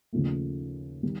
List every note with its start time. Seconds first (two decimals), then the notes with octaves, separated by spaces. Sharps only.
0.13 D#2 C#3 F3 A3
1.03 D#3 G3